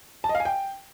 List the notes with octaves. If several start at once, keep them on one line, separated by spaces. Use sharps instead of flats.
A5
D#5
F5
G#5
G5